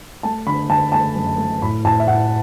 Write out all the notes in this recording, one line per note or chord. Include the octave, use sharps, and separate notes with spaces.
A3 A5
D3 B5
D3 A5
A3 A5
F#2
A3
A2 B5
A2 A5
E5
A2 F#5